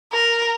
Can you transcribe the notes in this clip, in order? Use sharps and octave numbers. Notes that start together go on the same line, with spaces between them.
A#4